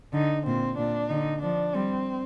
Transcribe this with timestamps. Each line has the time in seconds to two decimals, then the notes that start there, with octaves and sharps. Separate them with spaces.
0.13 D3 D#4
0.46 A#2 C4
0.78 A#2 D4
1.09 D3 D#4
1.42 F3 D4
1.74 G3 C4